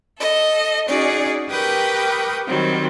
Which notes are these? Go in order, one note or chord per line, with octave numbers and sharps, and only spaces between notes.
A4 D#5
C#4 D#4 F#4 G#4 D5
G4 A#4 B4 G5 C#6 D#6
D#3 F#3 G3 C4